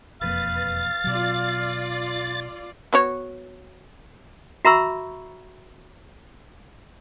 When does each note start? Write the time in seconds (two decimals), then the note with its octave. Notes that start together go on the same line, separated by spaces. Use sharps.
0.21 E1 F2 A#3 B4 F5 A6
1.04 B2 F#3 F4 D5
2.93 B3 F#4 C#5
4.65 F#4 E5 A#5 B5 C#6 E6